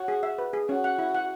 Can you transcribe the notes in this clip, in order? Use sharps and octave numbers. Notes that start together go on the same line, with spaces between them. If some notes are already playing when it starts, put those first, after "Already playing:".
Already playing: F#4 C#5
G#4
E5
B4
G#4
C#4 F#4
F#5
E4
F#5